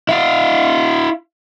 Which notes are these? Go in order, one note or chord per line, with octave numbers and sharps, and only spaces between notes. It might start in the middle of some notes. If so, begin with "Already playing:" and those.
E4 F5